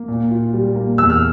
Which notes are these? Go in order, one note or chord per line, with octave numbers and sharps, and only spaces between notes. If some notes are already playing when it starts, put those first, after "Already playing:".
Already playing: A#3
A#2
F4
G3
A#3
E2 E6
F6